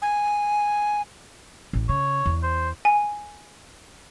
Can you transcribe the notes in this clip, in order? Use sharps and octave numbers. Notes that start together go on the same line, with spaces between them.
G#5
A1
C#3 C#5
E2
C5
G#5